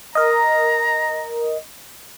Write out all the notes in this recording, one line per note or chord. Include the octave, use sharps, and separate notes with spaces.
A#4 D#5 A#5